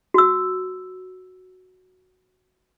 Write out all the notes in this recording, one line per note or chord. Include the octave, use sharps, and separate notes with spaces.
F#4 E6